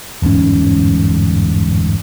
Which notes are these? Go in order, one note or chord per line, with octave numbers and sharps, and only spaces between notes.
G1 E2 G#2 C#4